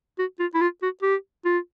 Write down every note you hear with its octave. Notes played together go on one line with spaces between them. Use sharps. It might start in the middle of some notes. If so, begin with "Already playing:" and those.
F#4
F4
E4
F4
F#4
G4
F4